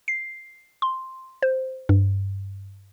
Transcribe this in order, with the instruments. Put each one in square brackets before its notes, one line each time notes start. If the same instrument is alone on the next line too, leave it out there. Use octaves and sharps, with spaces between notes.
[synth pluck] C7
C6
C5
G2